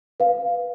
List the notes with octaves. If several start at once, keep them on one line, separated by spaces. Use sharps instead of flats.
B4 F5